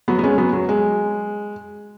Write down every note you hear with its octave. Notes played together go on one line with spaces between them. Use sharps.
F#3 B3
B3
G#3 C#4
F#3 B3
F#3
G#3